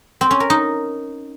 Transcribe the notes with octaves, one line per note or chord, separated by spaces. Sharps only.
C4
C#4
A#4
D#4